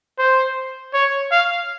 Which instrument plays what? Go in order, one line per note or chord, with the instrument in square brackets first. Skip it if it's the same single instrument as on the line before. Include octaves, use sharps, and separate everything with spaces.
[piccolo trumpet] C5
C#5
F5